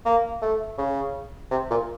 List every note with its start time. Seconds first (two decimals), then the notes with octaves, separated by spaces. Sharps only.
0.05 A#3
0.42 A3
0.78 C#3
1.51 C3
1.70 A#2